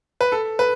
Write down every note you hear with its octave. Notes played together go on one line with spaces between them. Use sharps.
B4
A4
B4